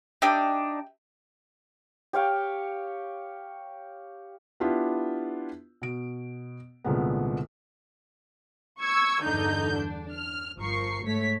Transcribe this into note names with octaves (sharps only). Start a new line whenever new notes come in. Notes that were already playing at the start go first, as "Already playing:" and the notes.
D4 D#4 G4 E5 G5
G4 C#5 F5 G5
B3 D4 E4 F4 G4
B2 D7
C2 A#2 D3 G#3 B3
C#6 E6 G#6
E2 G2 D3 D#4 G6
D4
F6
G1 F3 A#4 C#6 C7
G#2 A3 C#5 B6